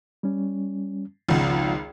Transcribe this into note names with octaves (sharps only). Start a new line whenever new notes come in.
G3 C#4
G#1 C#2 F3 F4 F#5